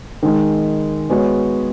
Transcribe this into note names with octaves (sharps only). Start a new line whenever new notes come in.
D#3 G#3 D#4
G#3 B3 F#4 C#5